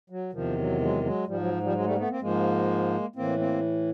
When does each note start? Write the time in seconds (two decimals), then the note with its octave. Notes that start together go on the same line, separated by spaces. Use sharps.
0.10 F#3
0.33 E2 C3 D#3 F3
0.57 F#3
0.80 F#3 G#3
1.03 F#3 G#3
1.27 G#2 F3 G3
1.39 F#3
1.63 F3 G3
1.75 F#3 G#3
1.85 G3 A3
1.94 A#3
1.98 A3 B3
2.10 A#3 C4
2.21 G#2 F3 G#3 A#3
3.16 A2 E3 A#3 C4
3.39 A#3 C4